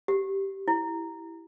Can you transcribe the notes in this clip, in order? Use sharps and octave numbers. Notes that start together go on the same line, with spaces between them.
G4
E4